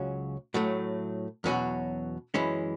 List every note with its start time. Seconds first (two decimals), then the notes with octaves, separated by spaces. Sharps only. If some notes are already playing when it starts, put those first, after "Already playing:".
Already playing: C#2 C#3 F#3 C#4 F#4
0.54 A2 F#3 A3
1.44 E2 B2 F#3 C#4 F#4
2.34 F#2 E3 G#3 C#4 E4